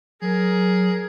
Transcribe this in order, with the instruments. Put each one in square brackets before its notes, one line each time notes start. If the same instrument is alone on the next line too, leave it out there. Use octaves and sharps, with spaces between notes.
[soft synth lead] F#3 [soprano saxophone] G#4 [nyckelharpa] A#4